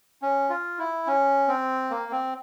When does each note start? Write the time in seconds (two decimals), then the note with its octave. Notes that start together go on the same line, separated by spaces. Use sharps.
0.22 C#4
0.50 F4
0.79 E4
1.07 C#4
1.48 C4
1.90 A#3
2.12 C4